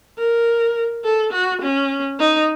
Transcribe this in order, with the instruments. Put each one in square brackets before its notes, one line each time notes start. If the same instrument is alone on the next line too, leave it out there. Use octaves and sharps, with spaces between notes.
[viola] A#4
A4
F#4
C#4
D#4